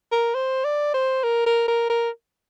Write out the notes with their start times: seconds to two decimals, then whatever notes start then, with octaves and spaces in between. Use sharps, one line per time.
0.12 A#4
0.34 C5
0.64 D5
0.94 C5
1.24 A#4
1.46 A#4
1.68 A#4
1.90 A#4